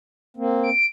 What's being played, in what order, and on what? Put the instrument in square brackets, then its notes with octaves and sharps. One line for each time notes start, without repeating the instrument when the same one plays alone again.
[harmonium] A#3 C4
[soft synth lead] D7